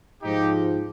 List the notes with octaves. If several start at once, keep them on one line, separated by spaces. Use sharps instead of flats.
G#2 F3 D#4 G4